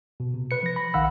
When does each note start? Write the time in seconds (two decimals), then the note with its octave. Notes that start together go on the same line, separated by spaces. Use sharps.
0.20 B2
0.34 C3
0.51 B4 C#7
0.63 F3 A#6
0.76 B5
0.94 A#1 D#3 F5 F#5 B5 E6